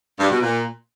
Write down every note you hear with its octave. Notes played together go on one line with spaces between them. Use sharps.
G2
B2
A#2